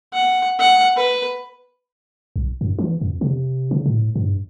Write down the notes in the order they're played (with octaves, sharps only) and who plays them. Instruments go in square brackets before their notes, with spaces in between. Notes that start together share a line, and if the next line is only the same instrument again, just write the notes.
[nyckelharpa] F#5
F#5
B4
[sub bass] B1
F#2
E3
F2
C3
C#3
A2
G2